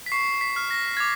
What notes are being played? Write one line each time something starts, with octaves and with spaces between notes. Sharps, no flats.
B6
C#6 C7
B6
F6
A#6
G#6
D6